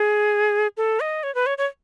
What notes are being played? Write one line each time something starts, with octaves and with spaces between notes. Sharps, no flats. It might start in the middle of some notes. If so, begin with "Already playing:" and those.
Already playing: G#4
A4
D#5
C#5
B4
C#5
C#5